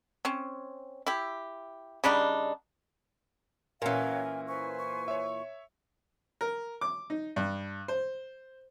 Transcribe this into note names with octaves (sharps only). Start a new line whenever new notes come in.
C4 C#4
E4 G4
C#3 G3 D4 D#4
A#2 E3 C#4 F#4 A#4 C#5 F5 G#5
B4 C5 G#5 C#6
C#6
C#5 E5
A#4
D6
D#4
G2
C5